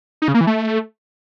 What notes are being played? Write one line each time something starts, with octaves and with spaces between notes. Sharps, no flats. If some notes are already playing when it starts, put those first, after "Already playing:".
D#4
C#3
A#3
E3
A3